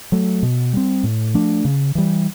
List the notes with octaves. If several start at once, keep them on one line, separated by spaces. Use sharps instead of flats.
F#3 A3
B2
G3 C4
A2
F3 A3 D4
C#3
E3 G3